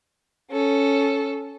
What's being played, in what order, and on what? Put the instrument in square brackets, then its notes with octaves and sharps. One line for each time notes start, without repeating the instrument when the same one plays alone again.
[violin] C#4 A4